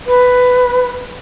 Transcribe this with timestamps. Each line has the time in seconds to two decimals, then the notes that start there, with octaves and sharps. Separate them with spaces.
0.06 B4